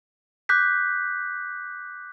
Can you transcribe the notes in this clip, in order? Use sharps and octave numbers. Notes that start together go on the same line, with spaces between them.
D6 F#6 G6 B6